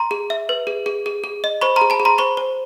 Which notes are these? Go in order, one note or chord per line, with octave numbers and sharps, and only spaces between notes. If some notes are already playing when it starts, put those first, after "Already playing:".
Already playing: A#5 C6
G#4
E5
B4
G#4
G#4
G#4
G#4
D#5
C5 B5 C#6
A#5 C6
G#4
A5 B5
G#4
A#5 C6
C5 B5 C#6
C5